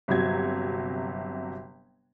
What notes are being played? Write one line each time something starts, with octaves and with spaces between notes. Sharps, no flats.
G1 C3 F#3 G#6